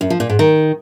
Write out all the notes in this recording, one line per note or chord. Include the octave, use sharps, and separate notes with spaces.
F#2
F3
A#2
G#2
D#3